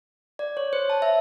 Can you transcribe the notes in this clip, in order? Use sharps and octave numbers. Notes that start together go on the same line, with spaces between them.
D5
C#5
C5
A5
E5